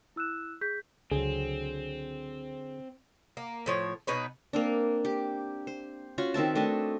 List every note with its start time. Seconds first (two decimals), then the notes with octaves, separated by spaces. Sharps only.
0.16 E4 E6 F#6 E7
0.61 G#4 G6 B6
1.11 C#2 D3 F#3 C4 G#4
3.37 A#3
3.66 A2 F3 C#5
4.07 B2 D#4 B4 C#5
4.53 A#3 C4 D4
5.05 G4
5.67 C5
6.18 C#4 F4 F#4
6.34 D#3 C4 E5 A5
6.55 A3 D4 D#5 A5